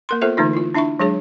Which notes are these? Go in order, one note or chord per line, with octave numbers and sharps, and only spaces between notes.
A#3 A#4 C6
A#3 B3 F4 A4 C5 E5
D3 E3 A3 D#4 F4
E4 F4
D4 E4 E5 B5 C#6
F#3 G#3 D4 G#4 C#5